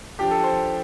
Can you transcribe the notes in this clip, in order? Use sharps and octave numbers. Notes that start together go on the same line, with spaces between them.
F3 D4 G4
A4
C5